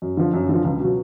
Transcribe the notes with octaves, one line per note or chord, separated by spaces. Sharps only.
F#2
D3 F3
F#2
D3 F3
C#2
B2 F#3